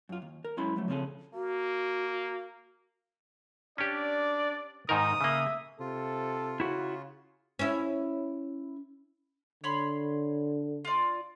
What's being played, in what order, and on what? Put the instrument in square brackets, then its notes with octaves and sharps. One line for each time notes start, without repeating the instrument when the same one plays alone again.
[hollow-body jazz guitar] F#2 F4
D#2
A#4
F#2 G#3 C#4 E4 B5 C6
F3 F#3 A3
C#3 F3 C4 C#4 G#4 A4
[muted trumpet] A#3 [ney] F#4
[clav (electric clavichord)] C#4 G4 [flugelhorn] D4 [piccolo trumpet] D5
[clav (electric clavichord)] G#2 D#3 A#4 [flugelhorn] D#4 [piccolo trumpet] D#6
[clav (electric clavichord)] C#3 A#3 [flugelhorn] E5
[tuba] C3 [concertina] F4 [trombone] A4
[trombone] C#3 [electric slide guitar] E4 F#4
[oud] C#4 E4
[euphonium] D3 [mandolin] C#5 B5 C6
[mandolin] F4 D5